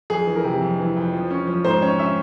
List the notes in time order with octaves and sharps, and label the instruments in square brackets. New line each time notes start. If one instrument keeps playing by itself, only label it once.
[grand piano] F2 G#4
E3
A#4
C3
F2
E3
F2
F3
C#4
F3
G#2 C5
C#4 C#5
C#4 E5